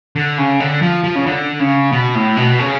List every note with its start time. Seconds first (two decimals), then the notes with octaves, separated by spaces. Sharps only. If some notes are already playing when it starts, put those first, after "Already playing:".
0.16 D3
0.38 C#3
0.60 D3
0.82 F3
1.04 F3
1.15 C#3
1.26 D3
1.60 C#3
1.92 B2
2.15 A2
2.37 B2
2.59 C#3